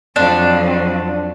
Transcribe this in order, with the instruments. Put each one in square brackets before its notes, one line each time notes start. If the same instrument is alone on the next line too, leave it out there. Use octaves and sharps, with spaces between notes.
[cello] F2 F#3 [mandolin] D4